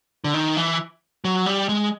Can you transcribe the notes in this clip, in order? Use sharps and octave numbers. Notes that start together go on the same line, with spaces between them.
D3
D#3
E3
F#3
G3
G#3